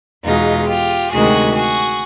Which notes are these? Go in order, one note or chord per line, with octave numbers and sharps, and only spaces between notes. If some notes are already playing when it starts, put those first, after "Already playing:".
E2 B2 G#3 D#4 F4
F4 G4
D2 C3 D#3 G#3 F#4 G#4
F#4 G#4